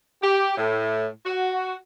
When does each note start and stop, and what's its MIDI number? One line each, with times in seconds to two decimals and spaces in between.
0.22 0.54 67
0.57 1.07 45
1.26 1.76 66